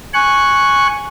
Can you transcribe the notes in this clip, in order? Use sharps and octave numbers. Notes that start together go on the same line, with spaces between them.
G#5 C#6 F#6